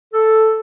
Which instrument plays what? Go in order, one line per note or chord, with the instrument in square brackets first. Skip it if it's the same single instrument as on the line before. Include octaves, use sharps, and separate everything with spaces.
[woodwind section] A4